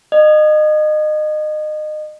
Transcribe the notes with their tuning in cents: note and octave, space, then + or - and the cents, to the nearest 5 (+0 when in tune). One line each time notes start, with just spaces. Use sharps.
D#5 -30